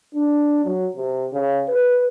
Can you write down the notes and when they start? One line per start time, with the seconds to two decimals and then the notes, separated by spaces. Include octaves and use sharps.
0.15 D4
0.65 F#3
0.96 C3
1.33 C#3
1.68 B4